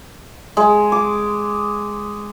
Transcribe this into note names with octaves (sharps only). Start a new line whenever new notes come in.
G#3
D6